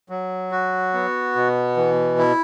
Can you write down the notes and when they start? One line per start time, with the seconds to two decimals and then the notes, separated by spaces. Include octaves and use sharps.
0.09 F#3
0.51 F#4
0.93 B3
1.35 B2
1.77 E3
2.18 E4